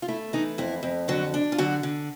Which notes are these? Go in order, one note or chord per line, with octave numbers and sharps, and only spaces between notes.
F4
A3 E4
E3 D#4
F2 E4
F2
D3 F#3 F#4
D4
F4
D3 F#3 F#4
D3